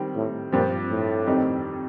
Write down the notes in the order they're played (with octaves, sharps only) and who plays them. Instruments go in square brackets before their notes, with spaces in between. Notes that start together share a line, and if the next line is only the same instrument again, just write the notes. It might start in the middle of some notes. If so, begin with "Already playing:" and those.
Already playing: [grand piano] D#3 G3 C4
[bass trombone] A2
[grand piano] G2 F3 C4 G4 [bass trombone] A#2
[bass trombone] A2
[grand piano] F2 D#3 G3 C4 D#4